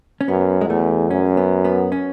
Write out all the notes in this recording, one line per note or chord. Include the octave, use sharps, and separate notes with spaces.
C#4
F#2 B3
G#3
E2 A3
F#2 C#4
B3
B3
C#4